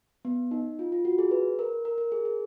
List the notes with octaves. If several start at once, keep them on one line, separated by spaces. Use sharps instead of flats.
B3
D#4
F4
F4
F#4
G#4
B4
A#4
A#4
A#4
G#4
G#4